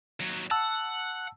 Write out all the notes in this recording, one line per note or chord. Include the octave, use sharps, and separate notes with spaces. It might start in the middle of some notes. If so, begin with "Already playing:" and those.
D#2 F#3
F#5 A5 E6